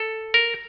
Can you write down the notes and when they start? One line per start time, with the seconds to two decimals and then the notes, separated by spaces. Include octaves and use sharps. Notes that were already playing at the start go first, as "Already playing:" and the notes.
Already playing: A4
0.34 A#4